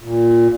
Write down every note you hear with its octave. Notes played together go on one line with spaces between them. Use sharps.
A#2